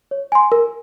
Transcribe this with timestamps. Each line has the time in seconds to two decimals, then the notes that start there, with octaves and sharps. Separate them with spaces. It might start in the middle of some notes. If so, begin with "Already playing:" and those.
0.11 C#5
0.32 G#5 C6
0.52 A#4